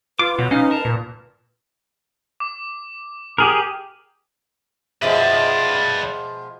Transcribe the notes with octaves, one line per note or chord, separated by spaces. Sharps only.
F4 B4 D6
B2 F#3
C#4 D#4 F5
A#4 A5 A#5
A#2
D6
G4 G#4 A#4 D#6 F#7
B2 F3 G#3 B4 D5 E5